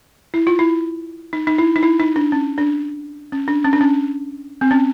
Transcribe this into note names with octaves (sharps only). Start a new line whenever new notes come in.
E4
F4
E4
D#4
D#4
E4
D#4
E4
D#4
D4
C#4
D4
C#4
D4
C#4
D4
C#4
C4
C#4